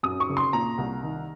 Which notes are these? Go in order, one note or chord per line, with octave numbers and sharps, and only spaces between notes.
F#2 D#6
C#6
F#1
C6
A#2 A#5
C2
D#3